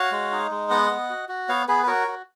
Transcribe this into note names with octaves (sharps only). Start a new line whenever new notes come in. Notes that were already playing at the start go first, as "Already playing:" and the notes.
Already playing: F#4 C#5 F5
G#3
D#4
G#3
B3 D#5 F#5
B3
F#4
F#4
B3 C#5 F5
B3 G#4 B4
B4
F#4 A#4 C#5
F#4